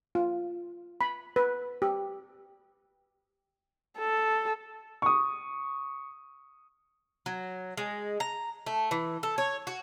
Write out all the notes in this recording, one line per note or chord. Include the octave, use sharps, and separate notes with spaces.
F4
B5
B4
G4
A4
C#6 D#6
F#3
G#3
A#5
A3
E3
A4
C#5
F#4